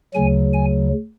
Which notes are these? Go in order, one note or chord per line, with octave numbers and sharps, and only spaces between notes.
D2 C#3 F#3 G#5
G#5